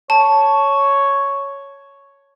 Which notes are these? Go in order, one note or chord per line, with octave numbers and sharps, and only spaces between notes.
C#5 A5